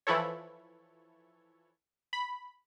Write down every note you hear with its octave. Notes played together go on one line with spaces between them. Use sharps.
E3 F3 E4 A4 C#5
B5